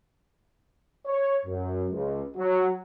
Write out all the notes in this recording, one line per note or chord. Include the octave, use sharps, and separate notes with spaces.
C#5
F#2
C#2
F#3